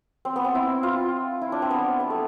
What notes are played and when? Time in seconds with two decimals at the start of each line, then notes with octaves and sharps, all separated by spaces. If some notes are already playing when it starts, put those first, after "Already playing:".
0.25 C4
0.36 B3
0.44 C4
0.55 E4
0.83 F4
1.41 E4
1.52 D4
1.62 C4
1.71 B3
2.00 B3
2.10 A3